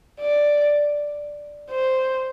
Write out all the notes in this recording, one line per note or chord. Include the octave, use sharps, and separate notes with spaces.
D5
C5